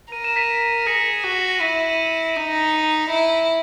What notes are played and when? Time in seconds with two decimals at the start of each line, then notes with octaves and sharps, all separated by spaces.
0.11 A#4 D#7
0.24 E7
0.36 B6 D#7
0.86 G#4 A#6 C#7
1.24 F#4
1.61 E4 B6 D#7
2.36 D#4
3.10 E4